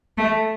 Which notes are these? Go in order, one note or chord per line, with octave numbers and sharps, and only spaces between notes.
A3